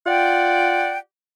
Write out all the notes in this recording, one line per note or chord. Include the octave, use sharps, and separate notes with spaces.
F4 D5 F#5 G5